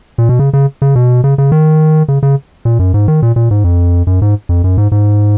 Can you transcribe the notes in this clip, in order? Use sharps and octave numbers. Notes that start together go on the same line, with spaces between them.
A#2
B2
C#3
C#3
C#3
B2
C#3
C#3
D#3
C#3
C#3
A#2
F#2
G#2
D#3
A#2
A#2
G#2
F2
F#2
G#2
F2
F#2
G#2
G#2